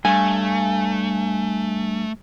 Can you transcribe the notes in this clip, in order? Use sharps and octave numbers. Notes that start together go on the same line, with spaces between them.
G2 A3 G#5